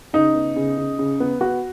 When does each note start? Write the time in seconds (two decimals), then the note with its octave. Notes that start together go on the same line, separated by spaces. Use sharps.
0.13 C#3 D#4
0.35 B3
0.56 C#3
0.78 C#3
0.99 C#3
1.20 B3
1.41 B3 F#4